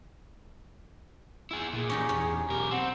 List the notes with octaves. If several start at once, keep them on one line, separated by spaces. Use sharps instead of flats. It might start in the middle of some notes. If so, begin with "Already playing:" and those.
E4 G#4
A#2 G#4
C#4 D#4 G4
E2 C#4
B1 G4 A#4
C4 F#5